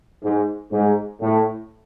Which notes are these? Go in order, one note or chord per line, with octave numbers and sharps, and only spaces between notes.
G#2
G#2
A2